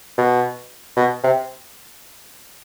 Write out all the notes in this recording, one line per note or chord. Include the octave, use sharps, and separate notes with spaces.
B2
B2
C3